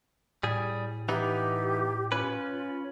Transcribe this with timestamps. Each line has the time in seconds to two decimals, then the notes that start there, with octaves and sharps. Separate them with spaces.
0.43 A2 G3 G#4
1.09 E3 B3 D#4 G4
2.12 C#4 F4 B4